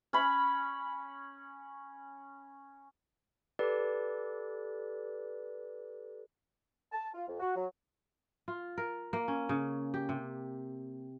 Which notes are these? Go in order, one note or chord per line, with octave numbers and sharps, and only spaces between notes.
C#4 B5
G4 A4 B4 D5
A5
F4
F2
F#4
F#3
F4
A#4
A#3
C#4
C#3
G4
C3